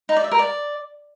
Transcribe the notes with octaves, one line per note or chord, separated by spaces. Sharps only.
D#4
D5
E5
A#4
D5